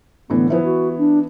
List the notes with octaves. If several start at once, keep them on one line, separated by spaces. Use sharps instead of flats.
A2 D3 E3 B3
E3 F3 B3 E4
F#4
D4